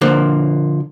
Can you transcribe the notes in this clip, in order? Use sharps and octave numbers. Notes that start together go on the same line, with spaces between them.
D3 F3 A#3 C5